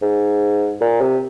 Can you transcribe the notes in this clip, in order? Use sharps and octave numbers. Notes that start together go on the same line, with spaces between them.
G#2
A#2
C3